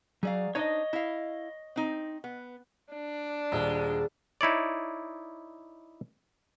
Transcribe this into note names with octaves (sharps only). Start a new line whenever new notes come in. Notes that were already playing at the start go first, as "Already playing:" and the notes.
F#3 G#4 D5 F5
D4 D#4 C5 C#5 D#5
E4 F5
C4 D#4
B3
D4
D#1 G#3
D#4 E4 C#5 D5